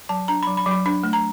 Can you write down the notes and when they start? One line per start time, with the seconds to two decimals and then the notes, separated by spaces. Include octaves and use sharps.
0.09 F#3 A5
0.28 D4 A#5
0.43 B5
0.47 F#3
0.57 B5
0.66 F#3
0.71 B5
0.86 D4 B5
1.03 A3
1.13 A#5